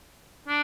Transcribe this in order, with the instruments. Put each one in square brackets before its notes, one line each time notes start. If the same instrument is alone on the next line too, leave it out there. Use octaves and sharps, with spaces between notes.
[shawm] D4